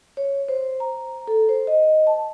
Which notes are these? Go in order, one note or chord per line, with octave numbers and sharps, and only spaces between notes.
C#5
C5
A#5
A4
C5
D#5
A5